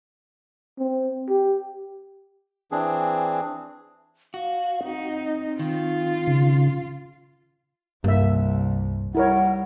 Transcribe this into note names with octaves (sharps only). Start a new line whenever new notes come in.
C4
G4
E3 C4 D4 G#4
F#4 F5
C4 D#4
D#3 F4
C#3
C2 G2 A#3 E5
G3 E4 A#4 C#5 F#5